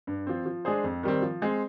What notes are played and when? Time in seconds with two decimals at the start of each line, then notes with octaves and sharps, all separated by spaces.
0.07 G2
0.27 F3 C4
0.46 F3
0.65 G#3 D4 G#4 C5
0.84 F2
1.03 D#3 G3 C4
1.22 F3
1.42 G#3 C4